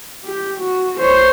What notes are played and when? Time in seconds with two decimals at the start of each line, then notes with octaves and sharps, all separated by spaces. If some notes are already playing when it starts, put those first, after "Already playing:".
0.25 G4
0.60 F#4
1.00 C5 C#5